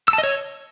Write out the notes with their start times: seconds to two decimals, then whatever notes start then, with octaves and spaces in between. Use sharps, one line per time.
0.08 E6
0.13 A5
0.18 D#5
0.24 C#5